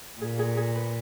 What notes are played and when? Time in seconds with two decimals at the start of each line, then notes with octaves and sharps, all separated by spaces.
0.21 A#2 G#4
0.39 G#4
0.57 G#4
0.76 B4